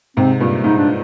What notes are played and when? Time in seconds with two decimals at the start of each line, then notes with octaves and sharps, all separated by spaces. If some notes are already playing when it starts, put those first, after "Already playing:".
0.17 G#2 C3 C4
0.41 G2 A#2
0.64 G#2 D#4
0.78 D4